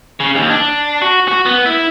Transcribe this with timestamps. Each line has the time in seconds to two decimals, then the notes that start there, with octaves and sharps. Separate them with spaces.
0.20 C#3
0.35 D#2
0.50 D4
1.02 F#4
1.28 F#4
1.46 B3
1.66 E4